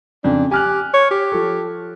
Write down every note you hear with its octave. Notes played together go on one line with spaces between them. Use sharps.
F2 C#3 D4
G4 G#5 F6 F#6
C#5
G4
F3 A4